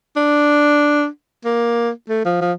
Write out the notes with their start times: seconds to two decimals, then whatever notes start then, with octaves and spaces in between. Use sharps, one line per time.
0.16 D4
1.45 A#3
2.09 A3
2.25 F3
2.41 F3